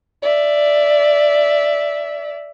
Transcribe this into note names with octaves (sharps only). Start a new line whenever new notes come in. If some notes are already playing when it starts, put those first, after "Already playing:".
D5 E5